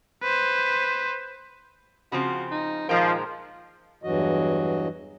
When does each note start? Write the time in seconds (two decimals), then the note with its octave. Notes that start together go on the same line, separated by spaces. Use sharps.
0.23 B4 C5
2.12 C#3 F3 C4 F#4
2.52 D#4
2.89 A#2 D#3 F3 G#3 G5
4.03 E2 G2 E3 F#3 F#4 D#5